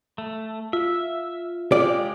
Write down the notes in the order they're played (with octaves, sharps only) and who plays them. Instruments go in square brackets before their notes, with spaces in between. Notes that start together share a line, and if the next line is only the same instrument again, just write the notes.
[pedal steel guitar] A3
[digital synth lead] F4 [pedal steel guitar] E5
[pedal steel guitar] G#3 G4 [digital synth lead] F4 [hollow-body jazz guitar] D5